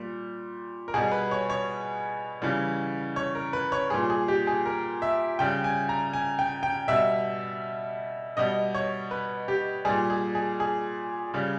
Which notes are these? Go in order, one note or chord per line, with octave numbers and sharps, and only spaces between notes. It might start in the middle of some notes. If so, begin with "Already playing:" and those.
Already playing: A#2 G3
A#4
B2 G3 G#4
B4
C#5
C#5
C#3 E3 G3
C#5
A#4
B4
C#5
A#2 G3 G#4
G#4
G4
G#4
A#4
E5
C#3 G3 G5
G#5
A#5
G#5
G5
G5
B2 G3 E5
B2 G3 D#5
C#5
B4
G4
A#2 G3 G#4
G#4
G#4
G#4
C#3 G3